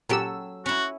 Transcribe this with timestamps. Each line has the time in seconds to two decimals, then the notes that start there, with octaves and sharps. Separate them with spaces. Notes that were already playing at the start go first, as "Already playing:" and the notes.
0.09 A#2 F#3 C#4 G4 A4 E6
0.66 C#4 E4 F#4